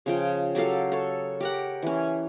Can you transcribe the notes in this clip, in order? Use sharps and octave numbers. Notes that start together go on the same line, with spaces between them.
C#3 F3 G5
F#3 G4 A4 F5
A4 C#5
G4 A#4 F#5
E3 C#4